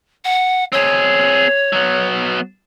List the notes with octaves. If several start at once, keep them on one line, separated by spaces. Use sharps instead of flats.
F#5
C4 G#4 C#5
F#3 B3